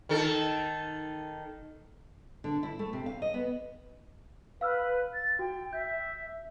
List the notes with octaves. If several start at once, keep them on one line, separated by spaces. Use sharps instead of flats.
D#3 A4
D3
E4
A3
C3
F5
D#5
B3
B4 F5 E6 F6
A6
F#4 G5
E5 G6